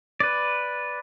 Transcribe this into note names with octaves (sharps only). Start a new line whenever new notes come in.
B4 D5